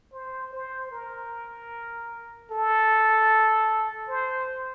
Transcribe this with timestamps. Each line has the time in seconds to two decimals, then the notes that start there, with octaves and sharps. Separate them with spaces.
0.12 C5
0.53 C5
0.91 A#4
2.51 A4
4.08 C5